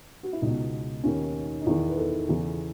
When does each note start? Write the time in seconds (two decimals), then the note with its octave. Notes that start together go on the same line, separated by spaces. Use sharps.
0.23 F#4
0.33 E4
0.41 C#2 B2 D#4
1.03 D#2 D#3 C#4
1.61 D#4
1.66 E2 D#3 E4
1.89 B4
1.97 A4
2.29 E2 C#3 E3